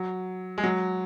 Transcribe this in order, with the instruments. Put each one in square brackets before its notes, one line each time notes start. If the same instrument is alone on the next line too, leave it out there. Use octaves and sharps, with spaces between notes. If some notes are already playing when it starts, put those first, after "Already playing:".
Already playing: [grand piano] F#3
G#3
F#3